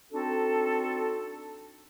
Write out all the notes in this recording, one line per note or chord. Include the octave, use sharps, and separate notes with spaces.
C4 D4 D#4 F#4 A4